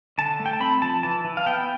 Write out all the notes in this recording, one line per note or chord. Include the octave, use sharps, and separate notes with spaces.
D3 A5
A3
G5
A5
C4 B5
F3 A5
E3 A5
E3
F5
B3 G5